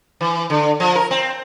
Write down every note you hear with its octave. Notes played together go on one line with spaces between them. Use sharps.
E3
D3
F3
A#4
C4